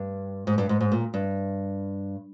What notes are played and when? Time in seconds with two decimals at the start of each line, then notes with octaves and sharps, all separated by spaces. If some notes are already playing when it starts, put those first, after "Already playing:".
Already playing: G2
0.47 G#2
0.58 G2
0.69 G#2
0.80 G#2
0.92 A#2
1.14 G2